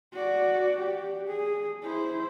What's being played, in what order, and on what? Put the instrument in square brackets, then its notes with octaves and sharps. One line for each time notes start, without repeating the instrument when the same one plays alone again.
[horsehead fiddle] F#4 D5
G4
G#4
E4 C5